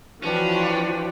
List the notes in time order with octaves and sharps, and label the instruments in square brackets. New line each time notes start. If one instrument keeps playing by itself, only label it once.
[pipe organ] E3 [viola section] F3 F#4 [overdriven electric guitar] C#4 [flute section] D4 B4 G5